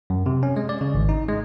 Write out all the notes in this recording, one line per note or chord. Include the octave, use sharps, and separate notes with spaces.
F#2
C3
C#4
G#3
D5
C#3
G#1
D#4
G#3